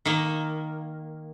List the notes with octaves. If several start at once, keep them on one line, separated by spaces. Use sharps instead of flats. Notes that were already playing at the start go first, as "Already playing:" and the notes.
D#3 A#3